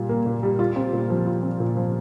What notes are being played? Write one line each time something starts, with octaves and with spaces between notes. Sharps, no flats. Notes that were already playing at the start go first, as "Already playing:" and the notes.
Already playing: A#2 G3 F4
A#3
A#2
G3
F4
C4
A#2
F3
F4
C4
A#2
F3